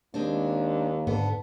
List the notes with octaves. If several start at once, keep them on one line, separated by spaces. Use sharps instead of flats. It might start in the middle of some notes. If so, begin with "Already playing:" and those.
D#2 G#3 C4 D4
G#2 D3 B3 A4